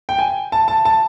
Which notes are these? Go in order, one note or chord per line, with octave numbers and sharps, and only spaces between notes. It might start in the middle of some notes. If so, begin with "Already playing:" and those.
G5
G#5
A5
A5
A5